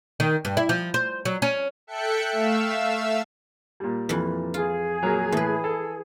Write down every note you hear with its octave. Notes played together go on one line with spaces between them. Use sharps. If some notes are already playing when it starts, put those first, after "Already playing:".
D#3
G2
E4
F3
C5
F#3
C#4
A4 E5 G5 F#6 C#7
A3 E5 F5 E6
A#2 G3
F2 E3
F4 G#4
A#2 F#3 A#4
A2 E3 B4
A4